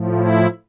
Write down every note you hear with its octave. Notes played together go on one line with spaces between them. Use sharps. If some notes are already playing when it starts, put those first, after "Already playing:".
Already playing: A2 F3
E4